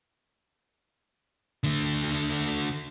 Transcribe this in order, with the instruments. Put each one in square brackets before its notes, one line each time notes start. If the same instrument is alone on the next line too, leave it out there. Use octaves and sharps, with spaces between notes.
[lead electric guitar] D3 A3